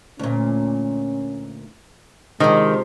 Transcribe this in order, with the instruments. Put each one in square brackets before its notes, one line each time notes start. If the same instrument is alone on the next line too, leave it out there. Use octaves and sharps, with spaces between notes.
[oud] D2 A#2 [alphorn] C#4
[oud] C3 F3 [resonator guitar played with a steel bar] D#3 [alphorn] G#3